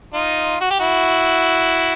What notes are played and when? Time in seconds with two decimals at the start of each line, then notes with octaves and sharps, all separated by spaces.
0.13 D#4 F4
0.61 F#4
0.70 G4
0.79 E4 F#4